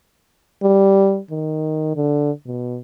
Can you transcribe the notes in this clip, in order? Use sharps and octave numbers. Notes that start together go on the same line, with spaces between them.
G3
D#3
D3
B2